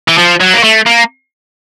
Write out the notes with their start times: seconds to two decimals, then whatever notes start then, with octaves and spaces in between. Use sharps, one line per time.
0.08 E3
0.18 F3
0.40 F#3
0.54 A#3
0.63 A3
0.86 A#3